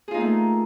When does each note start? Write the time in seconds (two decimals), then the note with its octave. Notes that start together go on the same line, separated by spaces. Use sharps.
0.08 G#4
0.11 F4
0.14 D#4
0.17 A#3
0.20 A3